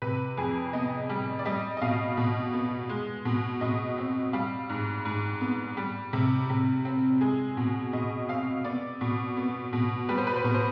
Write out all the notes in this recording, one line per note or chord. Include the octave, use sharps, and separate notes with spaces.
C3 B4
F2 G#4
B3 D#5
G3
D5
G3 D#5
D#5
B2 F5
B2
B3
G#3
B2
B2 D#5
C4
G3 F5
G#2
G#2
B3
G3
C3
C3
C4
G#3 G#4
B2
B2 D#5
C4 F5
B3 D5
B2
B3
B2
G3 B4
C5
B4
C5
B2 B4
C5